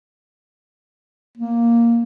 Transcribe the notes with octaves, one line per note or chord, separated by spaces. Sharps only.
A#3